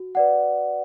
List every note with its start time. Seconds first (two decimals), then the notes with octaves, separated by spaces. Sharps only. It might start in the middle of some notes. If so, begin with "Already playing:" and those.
Already playing: F#4
0.15 B4 D5 F#5